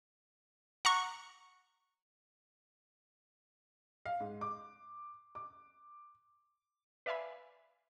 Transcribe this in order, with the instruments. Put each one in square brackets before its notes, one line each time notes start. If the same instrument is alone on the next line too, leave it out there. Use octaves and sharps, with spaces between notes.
[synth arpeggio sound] F#5 A#5 C#6
[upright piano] F5
G#2
D6
D6
[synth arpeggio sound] B4 D5 E5 F5 G#5 B5